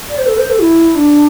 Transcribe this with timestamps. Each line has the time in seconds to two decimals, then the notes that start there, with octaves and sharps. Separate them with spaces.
0.09 D5
0.18 C5
0.27 A4
0.38 C5
0.50 A4
0.61 E4
0.95 D4